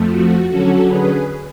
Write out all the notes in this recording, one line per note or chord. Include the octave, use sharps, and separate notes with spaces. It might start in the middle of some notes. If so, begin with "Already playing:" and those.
Already playing: F2 F3 A3
F#4
D3 F#3 C#4 F#4 A4
G#4 B4